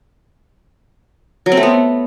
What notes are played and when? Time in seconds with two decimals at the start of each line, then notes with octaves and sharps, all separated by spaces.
1.46 F#3
1.52 C4
1.57 A3
1.63 B3